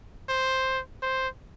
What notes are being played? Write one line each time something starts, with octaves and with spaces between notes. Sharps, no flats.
C5
C5